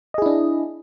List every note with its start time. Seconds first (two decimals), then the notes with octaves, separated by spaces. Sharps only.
0.14 D#5
0.18 G#4
0.22 E4
0.26 D4